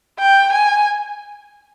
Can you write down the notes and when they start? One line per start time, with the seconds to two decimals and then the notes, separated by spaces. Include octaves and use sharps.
0.19 G5
0.53 G#5